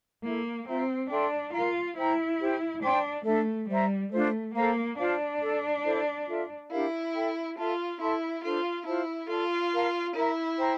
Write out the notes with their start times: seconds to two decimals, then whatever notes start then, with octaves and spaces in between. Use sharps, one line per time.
0.24 A#3 E4 A4 E5
0.67 C4 F4 C5 E5 A#5
1.10 D4 A4 E5 G5 C6
1.53 F4 A#4 F5 A#5
1.96 E4 C5 G5 A#5
2.40 G4 C5 G5
2.83 D4 C5 G5 C6
3.25 A3 D4 A4 E5
3.69 G3 C5 E5 A#5
4.12 A3 D4 F4 C5
4.56 A#3 A4 C5 F5 A#5
4.99 D4 F4 C5 F5 A5
5.41 A4 D5 A5
5.84 E4 A4 C5
6.27 F4 A4 E5
6.70 D4 E4 G4 A#4 F5
7.14 A4 E5 G5
7.57 F4 A4 E5 A5
8.00 E4 A4 E5 A5 C6
8.42 D4 F4 A4 C5
8.85 E4 F4 C5 F5 A5
9.29 F4 A4 D5 A5
9.72 A#4 F5 A5
10.15 E4 A#4 E5 A#5
10.59 C5 G5 A#5